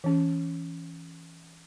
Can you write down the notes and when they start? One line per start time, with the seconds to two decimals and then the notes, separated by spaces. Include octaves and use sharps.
0.04 E3 C#4